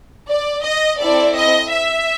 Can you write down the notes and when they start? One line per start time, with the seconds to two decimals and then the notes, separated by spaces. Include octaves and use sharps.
0.30 D5
0.65 D#5
1.00 C4 E4 A4 D5
1.36 D#5
1.72 E5